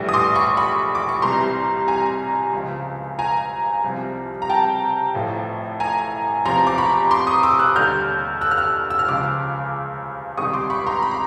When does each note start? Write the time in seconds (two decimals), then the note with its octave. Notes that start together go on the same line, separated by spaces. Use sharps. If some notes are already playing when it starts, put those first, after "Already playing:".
Already playing: A#1 A2 E3 G3
0.09 D#6
0.13 C6 D6
0.35 B5 C#6
0.57 B5 C#6
0.95 D6
1.09 C#6
1.22 C2 C3 E3 G3 A#5 C6
1.88 G#5 A#5
2.53 C#2 C#3 F3
3.19 G#5 A#5
3.84 C2 C3 F3
4.42 A#5
4.49 G5 A5
5.14 A1 A2 F3
5.80 G#5 A#5
6.45 E2 C3 F3 A#5 C6
6.67 D6
6.78 B5 C#6
7.11 C6 D6
7.27 C#6 D#6
7.43 D6 E6
7.59 E6 F#6
7.76 D#2 D3 G3 F6 G6
8.41 E6 F#6
8.51 F6
8.57 E6 F#6
8.90 E6
8.99 F6
9.07 C#2 C#3 F3 D6 E6
10.37 C#2 C3 D#3 G3 C#6 D#6
10.53 C6 D6
10.70 B5 C#6
10.86 A#5 C6
11.02 B5
11.11 A#5